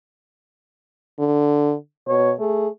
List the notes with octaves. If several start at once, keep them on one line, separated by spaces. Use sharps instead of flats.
D3
B2 C#5
A3 G#4